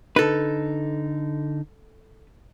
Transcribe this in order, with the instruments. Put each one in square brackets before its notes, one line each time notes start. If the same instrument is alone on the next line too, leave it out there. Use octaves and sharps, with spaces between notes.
[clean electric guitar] D3 D#4 [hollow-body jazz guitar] A4 B4